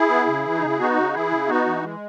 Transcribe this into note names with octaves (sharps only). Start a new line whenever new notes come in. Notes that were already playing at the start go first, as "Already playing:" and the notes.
Already playing: E4 G#4
B3
C#3
E3
D#4
C#3
E4
B3 D#4 F#4
C#3
E3 E4 G#4
C#3
B3 D#4 F#4
E3
G#3